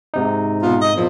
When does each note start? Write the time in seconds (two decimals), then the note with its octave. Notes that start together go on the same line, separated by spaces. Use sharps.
0.14 G#2 C3 D#4
0.62 B2 F4
0.82 D#5
0.95 E2 A#2 F3